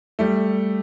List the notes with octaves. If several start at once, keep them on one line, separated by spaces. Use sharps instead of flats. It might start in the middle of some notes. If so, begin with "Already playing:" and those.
G3 A3